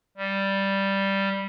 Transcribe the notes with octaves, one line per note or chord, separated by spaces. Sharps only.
G3